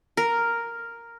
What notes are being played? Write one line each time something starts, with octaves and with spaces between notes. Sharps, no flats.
A#4